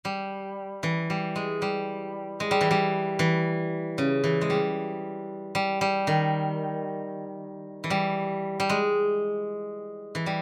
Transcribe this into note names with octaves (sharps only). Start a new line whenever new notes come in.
G3
E3
G3
G#3
G3
G#3
G3
E3
G3
E3
C#3
E3
G#3
G3
G3
G3
D#3
E3
G3
G3
G#3
E3
G3